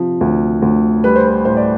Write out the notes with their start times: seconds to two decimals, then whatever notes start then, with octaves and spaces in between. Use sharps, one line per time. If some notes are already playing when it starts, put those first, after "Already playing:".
Already playing: C3 F3
0.21 D2
0.62 D2
1.04 G3 B4
1.16 C5
1.27 B4
1.45 A2 C5
1.57 D5